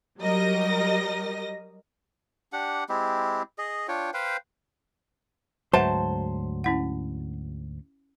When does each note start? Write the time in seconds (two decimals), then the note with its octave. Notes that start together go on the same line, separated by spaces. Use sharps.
0.20 F#3 G3 A#4 D#5 A#6
2.53 D4 G4 F#5
2.89 G#3 C4 E4 G4
3.58 G#4 D#5
3.88 D4 F4 C#5 G5
4.14 B4 C5 F5 G5
5.73 D2 G#2 F#3 B4 C5 E5 F#5 A5
6.64 C#4 E4 F#5